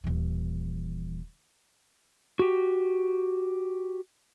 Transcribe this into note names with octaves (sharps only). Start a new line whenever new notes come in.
D#1 E3
F#4 G4